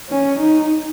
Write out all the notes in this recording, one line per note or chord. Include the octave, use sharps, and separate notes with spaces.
C#4
D#4